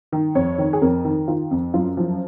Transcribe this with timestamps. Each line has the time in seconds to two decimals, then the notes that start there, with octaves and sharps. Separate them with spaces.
0.12 D#3
0.35 F2 C#5
0.58 D#3
0.73 G#4
0.82 F2 A#4
1.05 D#3
1.28 D#3 F4
1.51 F2
1.74 F#2 F4
1.97 F3 F4